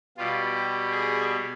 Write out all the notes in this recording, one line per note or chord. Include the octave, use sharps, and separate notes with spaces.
B2 G3 F4
G4
G#4